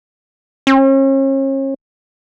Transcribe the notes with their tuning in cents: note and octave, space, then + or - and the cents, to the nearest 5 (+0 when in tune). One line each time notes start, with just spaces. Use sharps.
C#4 -40